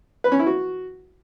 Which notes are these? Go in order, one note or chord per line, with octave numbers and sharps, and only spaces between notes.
B4
C#4
E4
F#4